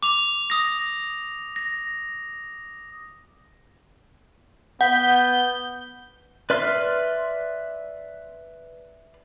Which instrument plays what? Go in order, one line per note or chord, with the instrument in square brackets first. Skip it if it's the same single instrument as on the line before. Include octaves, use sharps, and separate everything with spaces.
[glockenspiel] D6 F7
D#6 A#6
A#6
[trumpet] B3 [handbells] F#5 [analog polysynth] G6
[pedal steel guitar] B4 D5 E5 C6 F6